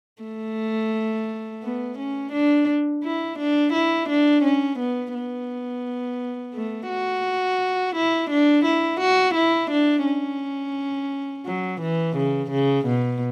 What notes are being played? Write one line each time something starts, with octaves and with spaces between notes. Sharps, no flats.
A3
B3
C#4
D4
E4
D4
E4
D4
C#4
B3
B3
A3
F#4
E4
D4
E4
F#4
E4
D4
C#4
F#3
E3
C#3
C#3
B2